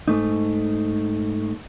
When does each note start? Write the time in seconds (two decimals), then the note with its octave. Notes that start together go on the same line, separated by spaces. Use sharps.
0.08 G#2 A3 D#4